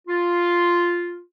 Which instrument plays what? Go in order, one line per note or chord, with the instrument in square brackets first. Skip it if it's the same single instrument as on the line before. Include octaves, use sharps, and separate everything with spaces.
[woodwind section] F4